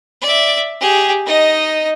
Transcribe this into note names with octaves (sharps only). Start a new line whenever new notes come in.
D5 E5
G4 G#4
D#4 D#5